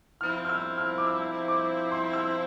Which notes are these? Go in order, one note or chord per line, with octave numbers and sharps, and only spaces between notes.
F3 C4 E4 F6
F6
E6
F6
D6
E6
D6
C6
E6